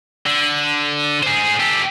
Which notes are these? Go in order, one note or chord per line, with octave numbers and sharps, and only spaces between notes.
D3
G#4 C5
G4 A4